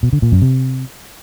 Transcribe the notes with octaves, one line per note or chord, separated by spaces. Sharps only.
B2
D3
A#2
F#2
C3